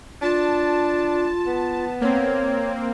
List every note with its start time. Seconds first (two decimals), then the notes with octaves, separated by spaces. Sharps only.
0.22 D4 F4 A5
1.46 B3
2.01 A#3 C4 C#5